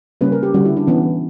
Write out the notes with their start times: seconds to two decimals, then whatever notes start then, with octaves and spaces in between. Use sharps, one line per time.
0.21 C#3 G3 A#3 C#4 B4
0.32 A#4
0.43 G4
0.54 D3 G3 C#4 F#4
0.65 E4
0.77 D4
0.87 E3 B3 C#4